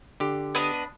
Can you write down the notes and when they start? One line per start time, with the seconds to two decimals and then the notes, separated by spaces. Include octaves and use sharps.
0.20 D3 G4
0.55 B3 D4 D#5